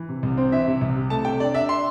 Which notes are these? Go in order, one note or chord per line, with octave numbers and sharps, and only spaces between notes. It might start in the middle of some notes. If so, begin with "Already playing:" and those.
Already playing: E3
C3
C2
C4
E3 E5
C3
C2
C3
A3 A5
C3 G5
D4 D5
D4 E5
C6